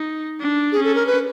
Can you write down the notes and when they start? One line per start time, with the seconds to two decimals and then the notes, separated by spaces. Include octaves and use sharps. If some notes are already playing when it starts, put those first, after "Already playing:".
Already playing: D#4
0.40 D4
0.72 G#4
0.79 C#4
0.84 A4
0.95 A#4
1.07 B4